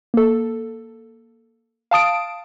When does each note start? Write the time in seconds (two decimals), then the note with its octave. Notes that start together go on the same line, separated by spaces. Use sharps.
0.14 A#3 A4
1.91 F5 A5 D#6 D7